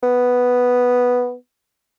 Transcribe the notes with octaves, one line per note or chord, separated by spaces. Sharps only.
B3